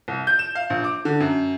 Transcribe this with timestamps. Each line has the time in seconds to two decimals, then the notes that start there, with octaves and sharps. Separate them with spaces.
0.08 C2
0.27 G6
0.39 E7
0.55 F5
0.70 A#1
0.84 D6
1.05 D3
1.20 F#2